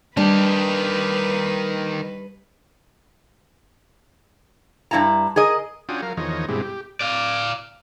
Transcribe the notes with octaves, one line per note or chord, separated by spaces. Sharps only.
D#3 G3 D4 G4 B4
G2 B2 E4 A5 A#5
G#4 A#4 D#5
C#4 D4 F4 F#4 G5 D#6
F#3 A#4 F5
E2 D#3 F3 C#5 D#5
G2 B2 G#3 C4 E4 G4
G4
D5 F5